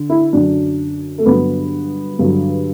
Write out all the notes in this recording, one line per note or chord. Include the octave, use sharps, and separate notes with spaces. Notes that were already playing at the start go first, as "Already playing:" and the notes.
Already playing: D3
E4
F#2 D3 F#3 D4
A3
G2 D3 F#3 B3
G2 D3 F#3